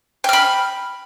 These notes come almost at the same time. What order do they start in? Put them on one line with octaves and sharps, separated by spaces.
G5 F6 B5